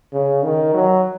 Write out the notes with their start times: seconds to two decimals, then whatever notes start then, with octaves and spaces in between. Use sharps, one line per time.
0.13 C#3
0.43 D#3
0.74 F#3